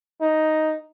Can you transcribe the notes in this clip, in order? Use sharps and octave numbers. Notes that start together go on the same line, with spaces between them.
D#4